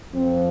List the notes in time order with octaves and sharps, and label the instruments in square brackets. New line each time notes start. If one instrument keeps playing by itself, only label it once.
[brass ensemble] F2 F3 C4